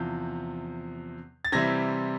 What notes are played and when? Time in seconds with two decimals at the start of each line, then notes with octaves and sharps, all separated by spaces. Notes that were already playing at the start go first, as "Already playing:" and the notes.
Already playing: E2 C3 F3 G6
1.45 A6
1.52 C3 E3 G3 C4 E4 G#6 A#6